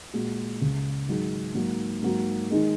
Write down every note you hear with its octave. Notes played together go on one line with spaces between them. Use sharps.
A#2 G#3 F#4
C#2 C#3 G#3
G#2 D#3 F#3 D#4 G#4
G#2 F#3 A#3
G#2 F#3 A#3 F#4
D#3 G#3 D#4 G#4